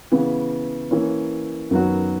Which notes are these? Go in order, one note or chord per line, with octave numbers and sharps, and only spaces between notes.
C#3 E3 B3
E3 A#3 C#4
F#2 D#3 F#3 B3 F#4